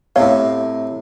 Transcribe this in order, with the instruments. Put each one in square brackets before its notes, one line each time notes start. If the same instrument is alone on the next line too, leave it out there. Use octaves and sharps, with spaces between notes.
[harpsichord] A2 C3 [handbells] B3 C#5 F5